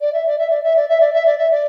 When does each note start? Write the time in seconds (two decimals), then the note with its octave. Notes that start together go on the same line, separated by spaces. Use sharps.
0.01 D5
0.13 E5
0.26 D5
0.38 E5
0.50 D5
0.63 E5
0.76 D5
0.88 E5
1.00 D5
1.13 E5
1.26 D5
1.38 E5
1.51 D5